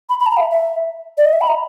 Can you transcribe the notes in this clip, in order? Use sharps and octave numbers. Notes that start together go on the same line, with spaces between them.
B5
B5
A5
A#5
F5
E5
E5
D5
D#5
E5
B5
A#5